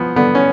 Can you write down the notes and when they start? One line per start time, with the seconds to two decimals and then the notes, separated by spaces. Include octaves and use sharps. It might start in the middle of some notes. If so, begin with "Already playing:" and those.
Already playing: F3 B3
0.16 D3 B3
0.35 C#4